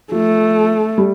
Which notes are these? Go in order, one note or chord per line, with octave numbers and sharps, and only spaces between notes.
F3 A3
G3